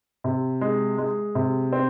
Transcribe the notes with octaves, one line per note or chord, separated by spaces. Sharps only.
C3
G#3
G#3
C3
C4